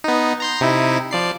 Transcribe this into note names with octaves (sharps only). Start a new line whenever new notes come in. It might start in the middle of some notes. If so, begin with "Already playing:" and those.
B3 D#4
A#5 C6 G6
C3 D#4 E4
F3 D5 C7